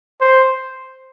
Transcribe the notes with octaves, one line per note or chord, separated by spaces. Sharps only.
C5